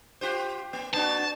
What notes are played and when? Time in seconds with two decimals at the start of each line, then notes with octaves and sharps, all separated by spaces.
0.21 F4 G4 C5
0.73 A#3
0.94 A#3 D4 F#4 A5